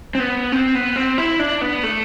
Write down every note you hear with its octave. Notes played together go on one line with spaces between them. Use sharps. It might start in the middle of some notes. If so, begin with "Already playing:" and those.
C4
B3
C4
B3
C4
E4
D4
B3
A3